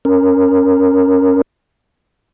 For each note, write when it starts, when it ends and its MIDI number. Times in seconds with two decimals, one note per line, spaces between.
0.05 1.42 61
0.05 1.42 70